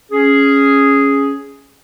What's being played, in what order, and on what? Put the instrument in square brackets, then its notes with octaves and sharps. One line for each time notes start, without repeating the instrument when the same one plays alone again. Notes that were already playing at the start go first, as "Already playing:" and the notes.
[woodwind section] C#4 G#4